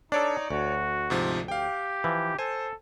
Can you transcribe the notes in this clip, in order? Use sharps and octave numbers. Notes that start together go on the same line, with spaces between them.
D4 D#4 A4 C#5 D5
D2 F#4
G#2 C3 F3
G4 F5 G5
E3 F3
A4 C5 G#5